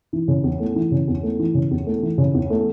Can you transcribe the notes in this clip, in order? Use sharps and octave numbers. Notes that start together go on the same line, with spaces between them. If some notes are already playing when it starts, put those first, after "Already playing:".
E3
C#3
E2
A3
E3
C#3
E2
A3
E3
C#3
E2
A3
E3
C#3
E2
A3